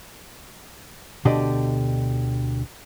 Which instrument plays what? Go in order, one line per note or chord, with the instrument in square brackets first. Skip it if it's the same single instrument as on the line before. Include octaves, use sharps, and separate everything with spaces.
[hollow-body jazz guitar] D2 B2 D3 G4 D5 D#5